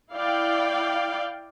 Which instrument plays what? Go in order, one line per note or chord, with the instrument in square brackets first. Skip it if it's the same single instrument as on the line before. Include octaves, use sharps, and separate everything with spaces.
[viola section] E4 D5 F5 G5